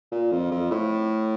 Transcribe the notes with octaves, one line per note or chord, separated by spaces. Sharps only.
A#2
F2
F2
A2